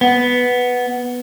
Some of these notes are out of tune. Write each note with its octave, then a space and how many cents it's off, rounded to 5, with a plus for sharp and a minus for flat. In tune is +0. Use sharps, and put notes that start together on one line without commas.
B3 +0